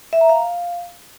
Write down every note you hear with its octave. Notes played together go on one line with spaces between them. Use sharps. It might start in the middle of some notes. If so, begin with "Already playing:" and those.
E5
A#5
F5